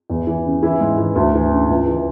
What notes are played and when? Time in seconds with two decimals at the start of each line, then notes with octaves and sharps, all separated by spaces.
0.10 E2
0.27 E3
0.45 C#3
0.63 E3 E4
0.80 G#2
0.98 E3
1.15 D2
1.34 E3
1.51 C#3
1.69 C#2
1.87 E3